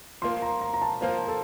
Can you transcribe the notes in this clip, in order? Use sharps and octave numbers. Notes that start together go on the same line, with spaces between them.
F3 A#3 F4 C6
A#5
A#5
A#5
A5
F3 A#3 F4 C5
A4